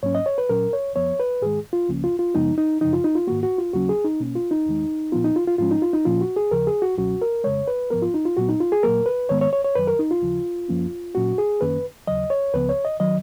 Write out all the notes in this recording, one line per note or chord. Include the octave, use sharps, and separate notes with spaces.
G#2 F#3 A#3 C#4 C#5
D#5
C#5
B4
A#2 F#3 C#4 A#4
C#5
F2 F3 B3 C#5
B4
G#2 D#3 G#3 G#4
F4
C#2 C#3 F3 A#3 C#4
F4
F4
F#2 C#3 F3 G#3 B3 D#4
D#4
F#2 C#3 F3 D#4
F4
D#4
F4
G#2 D#3 A#3 F#4
F#4
F4
D#2 C#3 F#3 A#3 C#4 F#4
G#4
D#4
B2 A#3 C#4
F4
D#4
D#2 D#3 G#3
A#2 F3 B3 F4
D#4
F4
F4
G#2 F3 G#3 C#4 F4
D#4
F4
D#4
A#2 F3 A#3 C#4 F4
F#4
G#4
D#2 C#3 F3 A#4
G#4
F#4
C#2 B2 F#3 C#4 F#4
A#4
F2 C#3 G#3 C#5
B4
G#2 F3 B3 A#4
F4
D#4
F4
A#2 F#3 B3 F#4
D#4
F4
G#4
A#2 F#3 A#3 A#4
B4
G#2 D#3 G#3 B3 C#5
C#5
C#5
C#5
F#2 D#3 F#3 B4
A#4
D#4
F4
D#2 C#3 F3
F#2 F3 A#3 C#4
A#2 F#3 A#3 C#4 F#4
G#4
F#2 D#3 A#3 C#4 B4
D#2 C#3 F#3 D#5
C#5
C#2 C#3 F3 B3 B4
C#5
D#5
D#3 F#3 D#5